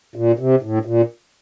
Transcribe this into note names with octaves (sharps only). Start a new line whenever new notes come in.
A#2
C3
A2
A#2